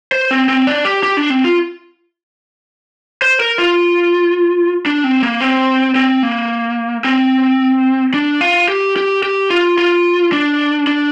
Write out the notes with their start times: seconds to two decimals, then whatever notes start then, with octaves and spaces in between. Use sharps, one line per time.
0.12 C5
0.31 C4
0.49 C4
0.67 D4
0.85 G4
1.03 G4
1.17 D4
1.30 C4
1.44 F4
3.22 C5
3.40 A#4
3.58 F4
4.86 D4
5.04 C4
5.23 A#3
5.41 C4
5.95 C4
6.23 A#3
7.04 C4
8.14 D4
8.41 F4
8.68 G4
8.96 G4
9.23 G4
9.50 F4
9.78 F4
10.32 D4
10.87 D4